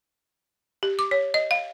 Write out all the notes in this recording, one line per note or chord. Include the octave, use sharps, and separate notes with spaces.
G4
D6
C#5
D#5
F5